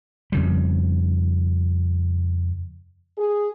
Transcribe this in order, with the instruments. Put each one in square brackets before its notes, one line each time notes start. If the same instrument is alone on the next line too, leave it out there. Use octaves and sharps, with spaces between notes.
[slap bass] F2 C#3 G3
[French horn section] G#4